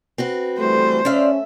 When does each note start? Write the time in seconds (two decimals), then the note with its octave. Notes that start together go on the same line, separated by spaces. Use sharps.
0.18 C4 F#4 B4
0.59 E3 G3 A3 C5
1.05 A3 C#4 D5 E5 F5